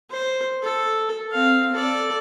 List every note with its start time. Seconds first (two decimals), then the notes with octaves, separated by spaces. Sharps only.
0.11 C5
0.63 A4
1.32 C4 F5
1.72 A4 D5